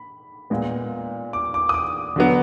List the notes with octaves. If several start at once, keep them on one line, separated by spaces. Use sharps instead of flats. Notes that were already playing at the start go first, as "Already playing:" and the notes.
Already playing: B5
A#2 G#3 B3
D6
D6
D#6
D6
D3 F#3 B3